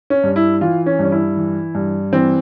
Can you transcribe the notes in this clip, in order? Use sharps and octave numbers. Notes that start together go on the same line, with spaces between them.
C#4
G2
E4
E3 F4
C#4
G2
C#4
E4
E3
G2
E3 C4